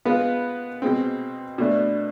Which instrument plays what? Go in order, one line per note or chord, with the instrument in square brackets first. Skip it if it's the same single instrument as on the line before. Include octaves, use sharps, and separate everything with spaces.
[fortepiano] G#3 B3 F4 B4
B2 G#3 C4
B2 A3 D4